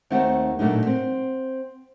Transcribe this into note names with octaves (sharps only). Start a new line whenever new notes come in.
D#2 A3 C4 D#4 F#5
A#2 F#3 A3 D4 D#4
C4